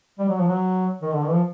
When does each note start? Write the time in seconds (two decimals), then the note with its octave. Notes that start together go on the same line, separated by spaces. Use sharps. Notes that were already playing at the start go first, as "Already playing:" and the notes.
0.19 G3
0.29 F#3
0.39 F3
0.48 F#3
1.02 D#3
1.13 D3
1.23 D#3
1.29 E3
1.34 F3